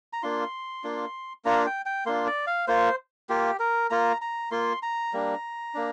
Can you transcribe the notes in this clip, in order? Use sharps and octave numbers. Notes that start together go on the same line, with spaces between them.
A#5
A#3 D4 F4 C6
A#3 D4 F4
A#3 D4 F4 A#5
G5
G5
A#3 D4 F4 C6
D5
F5
A#3 F4 C5
A#3 F4 G4
A#4
A#3 F4 A#5
A#5
A#3 F4 C6
A#5
G3 A#3 D4
A#3 D4